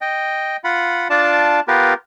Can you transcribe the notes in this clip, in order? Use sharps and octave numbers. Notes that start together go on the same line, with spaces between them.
D#5 G5
F4 F#5 B5
D4 F4 D5 A5
B3 F4 G4 A#4 B4